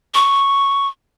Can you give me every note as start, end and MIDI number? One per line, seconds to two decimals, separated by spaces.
0.14 0.88 85